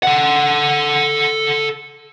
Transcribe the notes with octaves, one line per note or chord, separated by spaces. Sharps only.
A4 F#5